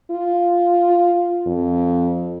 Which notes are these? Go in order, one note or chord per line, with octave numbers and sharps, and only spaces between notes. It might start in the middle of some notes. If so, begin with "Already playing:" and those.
F4
F2